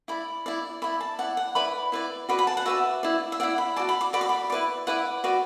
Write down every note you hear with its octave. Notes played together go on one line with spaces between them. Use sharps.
E4 D5 B5
E4 D5
E4 D5 B5
A5
E4 D5 F#5
F#5
E4 B4 D5 B5
E4 B4 D5
F#4 B4 D5 B5
B5
A5
F#5
F#4 B4 D5 E5
E4 D5
E5
E4 D5 F#5
B5
F#4 D5 A5
B5
D6
F#4 D5 B5
D6
B5
E4 B4 D5
E4 B4 D5 F#5
F#4 B4 D5